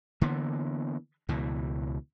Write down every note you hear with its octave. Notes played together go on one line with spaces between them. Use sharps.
D3 E3 A#3 B3
C#2 B2 E3